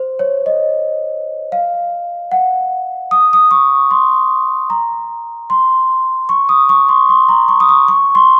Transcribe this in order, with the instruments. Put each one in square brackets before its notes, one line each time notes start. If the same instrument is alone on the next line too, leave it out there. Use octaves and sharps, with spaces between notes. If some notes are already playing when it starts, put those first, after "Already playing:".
Already playing: [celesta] C5
C#5
D#5
F5
F#5
D#6
D#6
C#6
C6
A#5
C6
C#6
D#6
C#6
C6
C6
A#5
C#6
D#6
C#6
C#6
C6